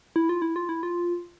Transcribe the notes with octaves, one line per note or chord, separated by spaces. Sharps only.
E4
F4
E4
F4
E4
F4